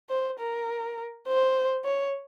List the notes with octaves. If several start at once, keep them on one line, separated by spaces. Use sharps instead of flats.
C5
A#4
C5
C#5